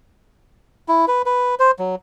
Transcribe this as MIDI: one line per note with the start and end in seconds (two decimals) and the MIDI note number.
0.88 1.05 64
1.08 1.22 71
1.26 1.55 71
1.59 1.71 72
1.79 1.95 54